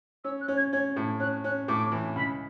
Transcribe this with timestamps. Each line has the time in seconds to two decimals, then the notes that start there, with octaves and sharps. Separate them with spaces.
0.24 C#4 E6
0.41 F#6
0.48 C#4
0.57 G#6
0.72 C#4 G#6
0.96 A2
1.20 C#4 F#6
1.44 C#4 F#6
1.68 A2 D6
1.92 E3
2.16 C#2 B5